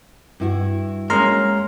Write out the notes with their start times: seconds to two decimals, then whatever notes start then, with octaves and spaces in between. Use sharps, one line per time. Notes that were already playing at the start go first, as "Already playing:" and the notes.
0.40 G2 E4 F#4
1.10 G#3 A#3 C#4 A#5 C6 F6